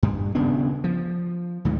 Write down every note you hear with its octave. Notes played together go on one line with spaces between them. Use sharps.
G2
D#1 C#3 B3 D4
F3
D2 G#2